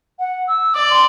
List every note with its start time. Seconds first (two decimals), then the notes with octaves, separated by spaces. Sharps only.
0.19 F#5
0.47 E6
0.74 D5 D6
0.90 C6